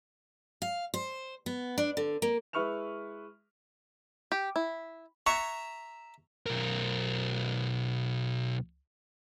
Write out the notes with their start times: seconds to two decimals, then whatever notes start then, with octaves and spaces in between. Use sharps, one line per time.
0.62 F5
0.94 C5
1.46 B3
1.78 D4
1.97 D3
2.22 A#3
2.53 G#3 E4 B4 C#6 F6 F7
4.32 G4
4.56 E4
5.26 E5 A#5 C#6
6.46 B1 A#4